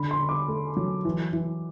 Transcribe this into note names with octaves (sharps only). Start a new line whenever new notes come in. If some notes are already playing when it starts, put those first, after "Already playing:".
Already playing: D3 B5
C6
D3
D6
A3
F#3
E3
E3